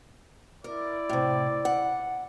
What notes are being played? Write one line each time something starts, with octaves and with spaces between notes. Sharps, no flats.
E4 A#4 D5
A2 C3
F#5